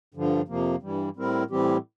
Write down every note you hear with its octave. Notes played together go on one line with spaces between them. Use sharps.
G2 D3 F3
F2 C3 F3 A#3
G2 E3 G3
A2 G3 C4 E4 A#4
A2 E3 G3 C4 G4